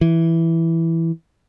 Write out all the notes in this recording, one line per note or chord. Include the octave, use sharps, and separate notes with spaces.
E3